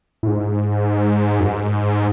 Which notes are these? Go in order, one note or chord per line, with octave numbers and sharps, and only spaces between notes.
A2
G#2
F#2
G#2